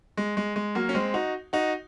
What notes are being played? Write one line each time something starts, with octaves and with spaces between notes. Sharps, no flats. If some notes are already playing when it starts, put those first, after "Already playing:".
G#3
G#3
G#3
F#3 A#3
C#4
G#3 C4
D#4 F#4
D#4 F#4